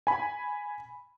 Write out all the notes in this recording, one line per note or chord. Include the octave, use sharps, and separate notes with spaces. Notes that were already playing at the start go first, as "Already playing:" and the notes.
G#5 B5